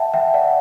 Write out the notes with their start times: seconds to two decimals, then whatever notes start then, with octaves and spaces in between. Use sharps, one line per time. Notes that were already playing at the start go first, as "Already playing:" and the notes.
Already playing: E5 F#5 G5 A5
0.14 E5 G5
0.34 D5 F#5